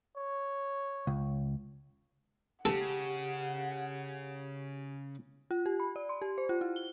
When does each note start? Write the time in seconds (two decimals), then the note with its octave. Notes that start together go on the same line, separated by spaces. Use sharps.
0.17 C#5
1.07 C#2
2.65 C#3 G4 A4 F#5 A5
5.51 F4
5.66 G4
5.80 B5
5.96 D5
6.09 C6
6.22 G4
6.38 C5
6.49 F4
6.61 E4
6.76 G7